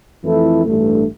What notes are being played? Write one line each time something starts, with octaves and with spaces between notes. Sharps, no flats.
F2 E3 A3 E4 A4
A1 G2 D3 A3